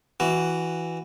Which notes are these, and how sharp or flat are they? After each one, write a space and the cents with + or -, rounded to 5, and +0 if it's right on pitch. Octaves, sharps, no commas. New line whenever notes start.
E3 +0 F#4 +0